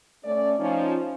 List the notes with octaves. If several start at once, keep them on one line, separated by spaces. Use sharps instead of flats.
A3 C#4 D5
F3 C#4 D#4